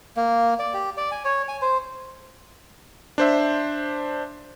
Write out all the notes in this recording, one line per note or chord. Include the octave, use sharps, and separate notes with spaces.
A#3
D5
G4
D5
G#5
C#5
G#5
C5
D4 C5 E5